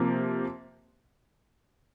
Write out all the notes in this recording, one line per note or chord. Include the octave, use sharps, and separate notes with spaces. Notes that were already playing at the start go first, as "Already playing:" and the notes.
Already playing: C3 F3 A#3